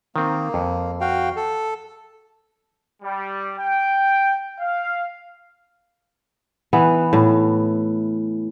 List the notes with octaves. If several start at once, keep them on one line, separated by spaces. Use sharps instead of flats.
D#3 A#3 C4
F2
F#4 F5 G5
A4
G3
G5
F5
E3 B3
A2